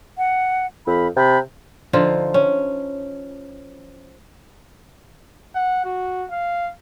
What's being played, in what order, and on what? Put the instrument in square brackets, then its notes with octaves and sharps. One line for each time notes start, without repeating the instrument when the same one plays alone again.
[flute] F#5
[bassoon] F2 [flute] B5
[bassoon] C3 [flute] B5
[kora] D3 F3 D#4 F4
C#4
[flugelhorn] F#5
F#4
F5